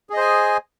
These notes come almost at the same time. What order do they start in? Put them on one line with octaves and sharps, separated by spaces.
G#4 D#5 C5 G#5